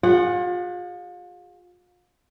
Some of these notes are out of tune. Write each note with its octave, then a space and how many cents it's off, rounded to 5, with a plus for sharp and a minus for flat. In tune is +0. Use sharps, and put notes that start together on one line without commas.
F4 +35 G#4 -40 F#5 +5